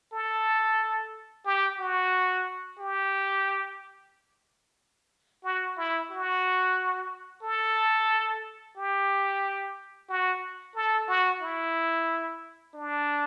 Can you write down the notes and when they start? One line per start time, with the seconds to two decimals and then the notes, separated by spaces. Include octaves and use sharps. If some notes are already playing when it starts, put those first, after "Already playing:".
0.13 A4
1.45 G4
1.79 F#4
2.79 G4
5.44 F#4
5.77 E4
6.11 F#4
7.43 A4
8.77 G4
10.09 F#4
10.75 A4
11.09 F#4
11.42 E4
12.75 D4